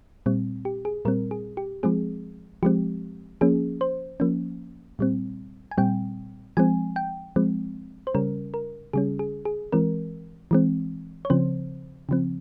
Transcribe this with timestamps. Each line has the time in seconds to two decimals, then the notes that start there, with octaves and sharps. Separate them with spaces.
0.26 A#2 G3 C4
0.65 G4
0.85 G#4
1.05 A#2 G3 C4 A#4
1.31 G#4
1.57 G4
1.83 F3 G#3 C4 G#4
2.63 F3 G#3 C4 G4
3.41 F3 A#3 C#4 G#4
3.81 C5
4.20 F3 A#3 C#4
4.99 A#2 G3 C4
5.71 G#5
5.78 A#2 G3 C4 G5
6.57 F3 G#3 C4 G#5
6.96 G5
7.36 F3 G#3 C4
8.07 C5
8.14 C#3 G3 C#4 A#4
8.54 A#4
8.93 C#3 G3 C#4 G#4
9.19 G#4
9.45 G#4
9.72 E3 G#3 C4 A#4
10.51 E3 G#3 C4
11.25 C#5
11.30 C#3 F3 C4 C5
12.09 C#3 F3 C4